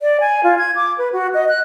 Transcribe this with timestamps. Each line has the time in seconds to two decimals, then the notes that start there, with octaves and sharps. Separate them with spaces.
0.01 D5
0.21 G#5
0.44 F4
0.58 G#6
0.76 D6
0.98 B4
1.13 F#4
1.34 D#5
1.49 F#6